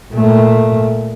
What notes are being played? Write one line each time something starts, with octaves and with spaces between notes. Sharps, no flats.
A#2 A3